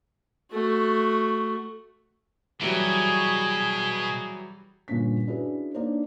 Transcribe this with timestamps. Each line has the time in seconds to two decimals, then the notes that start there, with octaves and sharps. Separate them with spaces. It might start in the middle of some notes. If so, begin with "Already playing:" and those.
0.52 A3 F#4
2.61 B2 E3 F#3 G3 G#4
4.88 G2 A#2 D3 A#3 C#4 B6
5.27 C#4 D4 E4 F#4 G#4 B4
5.74 A#3 D4 D#4 A#4 C5 C#5